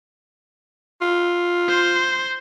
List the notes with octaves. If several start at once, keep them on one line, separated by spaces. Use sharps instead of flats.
F4
C5